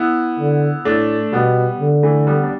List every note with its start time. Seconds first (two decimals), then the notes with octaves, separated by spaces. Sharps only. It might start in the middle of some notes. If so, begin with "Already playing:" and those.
Already playing: B3 E4
0.39 D3
0.85 A2 A3 D4
1.33 B2 G3 B3
1.79 D3
2.03 E3 A3
2.27 G3 B3
2.44 D4